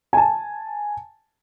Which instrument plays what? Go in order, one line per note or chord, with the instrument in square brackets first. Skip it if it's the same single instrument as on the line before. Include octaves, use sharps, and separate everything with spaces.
[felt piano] G#5 A5